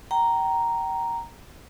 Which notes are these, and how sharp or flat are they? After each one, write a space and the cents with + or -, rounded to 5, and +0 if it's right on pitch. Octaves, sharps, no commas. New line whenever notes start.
G5 -30 A#5 +0